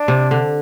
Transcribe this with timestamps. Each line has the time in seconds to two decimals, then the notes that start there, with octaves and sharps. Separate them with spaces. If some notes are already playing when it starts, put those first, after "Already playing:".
Already playing: D4
0.08 C3
0.31 D3